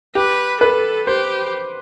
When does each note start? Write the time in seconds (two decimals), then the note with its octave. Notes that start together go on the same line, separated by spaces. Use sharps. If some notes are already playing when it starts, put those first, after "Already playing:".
0.15 G4 B4
0.61 A4 B4
1.07 G4 C5